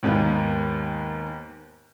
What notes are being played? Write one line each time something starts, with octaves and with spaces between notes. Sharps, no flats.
D#2 G#2 D#3 A#3 B3